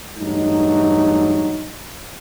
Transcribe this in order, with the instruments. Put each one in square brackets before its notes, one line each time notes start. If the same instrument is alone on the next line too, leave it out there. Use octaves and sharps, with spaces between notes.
[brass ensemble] E2 G2 F#3 A3 D#4